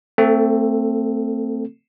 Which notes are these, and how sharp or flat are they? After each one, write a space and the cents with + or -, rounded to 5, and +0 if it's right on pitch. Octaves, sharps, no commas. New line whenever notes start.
A3 +35 C4 +0 A4 +0